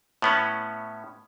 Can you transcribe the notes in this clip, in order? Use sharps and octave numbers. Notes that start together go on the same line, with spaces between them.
A2 B3 C#4